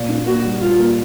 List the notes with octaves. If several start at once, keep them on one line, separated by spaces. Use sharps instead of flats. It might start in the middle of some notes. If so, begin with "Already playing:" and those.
Already playing: A#2
D4
A#3 F#4
G3
G3 F4
A#3